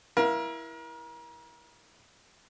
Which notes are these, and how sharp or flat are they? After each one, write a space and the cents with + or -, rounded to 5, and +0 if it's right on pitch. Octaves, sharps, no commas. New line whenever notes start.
E4 +0 A#4 +35 F5 -5